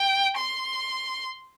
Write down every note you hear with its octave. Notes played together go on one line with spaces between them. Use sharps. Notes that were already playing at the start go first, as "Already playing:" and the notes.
Already playing: G5
C6